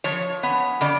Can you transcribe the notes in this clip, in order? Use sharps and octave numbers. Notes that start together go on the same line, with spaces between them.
F3 C#5
B3
C#3 D5